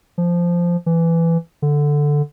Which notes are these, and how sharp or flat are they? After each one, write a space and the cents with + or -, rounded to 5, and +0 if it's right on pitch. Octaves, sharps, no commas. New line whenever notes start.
F3 -10
E3 +15
D3 +0